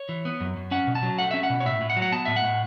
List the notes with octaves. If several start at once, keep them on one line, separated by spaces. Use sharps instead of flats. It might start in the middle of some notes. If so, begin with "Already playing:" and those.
Already playing: C#5
E3
B3
F#2
F#2
C#4 F#5
B2
A5
F#3
A3 F#5
C#4 E5
F#5
B2
C#5
A2 E5
A2
F#5
F#3
F#5
B3 A5
A2 E5
F#5
A2